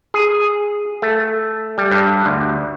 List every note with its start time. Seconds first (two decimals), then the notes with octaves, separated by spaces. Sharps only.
0.14 G#4
1.02 A3
1.78 G3
1.91 G2
2.26 D2